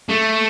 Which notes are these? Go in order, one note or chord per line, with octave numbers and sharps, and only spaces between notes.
A3